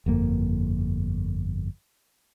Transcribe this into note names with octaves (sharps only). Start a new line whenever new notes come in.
G1 F2 A#3